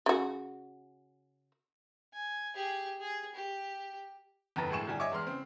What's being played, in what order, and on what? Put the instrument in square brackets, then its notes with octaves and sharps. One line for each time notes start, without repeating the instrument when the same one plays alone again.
[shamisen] C#3 F#4
[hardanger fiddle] G#5
G4 G#4
G#4
G4
[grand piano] G1 F2 B4 A#5 A6
E1 A2 G#3 G#4 C#6 E7
G1 G3 G#5
C#5 D#5 E5 G#5 C#6 D6
E2 G#3 C6 F6
C#3 C4